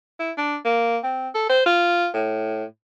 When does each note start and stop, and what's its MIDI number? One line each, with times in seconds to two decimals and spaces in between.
0.19 0.31 64
0.37 0.57 62
0.65 0.98 58
1.04 1.28 60
1.35 1.45 69
1.50 1.64 72
1.66 2.08 65
2.14 2.64 45